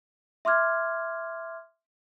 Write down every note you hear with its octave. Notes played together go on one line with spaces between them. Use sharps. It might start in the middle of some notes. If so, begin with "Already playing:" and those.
E5 C6 D6 F6 G#6